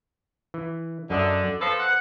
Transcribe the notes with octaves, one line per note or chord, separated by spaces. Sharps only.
E3
F#2 D3 D#5 E5
F3 C4 A4 B4 C5
F#5